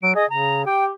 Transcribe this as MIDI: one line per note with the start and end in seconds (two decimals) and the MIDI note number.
0.03 0.11 54
0.03 0.15 98
0.15 0.25 68
0.15 0.29 75
0.30 0.65 49
0.30 0.64 82
0.66 0.91 67
0.66 0.85 79